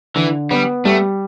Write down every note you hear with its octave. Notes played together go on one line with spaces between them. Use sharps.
D3 E3
G3 B3
G3 A3